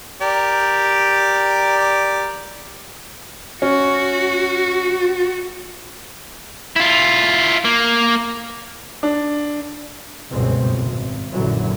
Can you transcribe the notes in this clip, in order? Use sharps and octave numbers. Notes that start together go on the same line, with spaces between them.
G4 A#4 D5
C#4 F#4
E4 F4
A#3
D4
G1 C#2 F#2 B2 G#3 C4
G#1
A#1 F#2 A#2 D3 E3 F#3